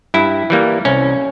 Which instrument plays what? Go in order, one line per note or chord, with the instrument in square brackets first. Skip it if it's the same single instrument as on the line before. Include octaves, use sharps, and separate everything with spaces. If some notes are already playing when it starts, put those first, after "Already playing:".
[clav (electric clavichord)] G2 E4
E3 G3 A#3
C2 C#4